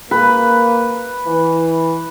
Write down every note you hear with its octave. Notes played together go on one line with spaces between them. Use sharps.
A#3 B4
E3